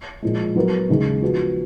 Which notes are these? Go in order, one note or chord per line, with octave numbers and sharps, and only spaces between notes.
A#2 F3 G#3
F#3 B3 F#4 A#4
D#2 C#3 G#3
F3 B3 F#4